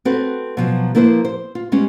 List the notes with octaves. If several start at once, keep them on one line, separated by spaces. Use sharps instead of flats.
C4 F#4 A4 B4
B2 F3 F#3
F3 A#3 E4 B4 C5
C5
F4
G3 G#3 B3 C#4